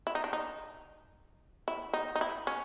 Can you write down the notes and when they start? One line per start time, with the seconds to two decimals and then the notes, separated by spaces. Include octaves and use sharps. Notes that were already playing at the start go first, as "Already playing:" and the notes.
0.07 E4
0.15 D#4
0.24 D4
0.33 D#4
1.68 E4
1.93 D#4
2.15 D#4
2.21 E4
2.47 C#4